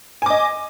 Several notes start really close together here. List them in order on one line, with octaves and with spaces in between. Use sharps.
G#5 D6 D#5